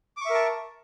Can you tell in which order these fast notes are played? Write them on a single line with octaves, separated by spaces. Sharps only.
D6 C#6 E5 A#4 A5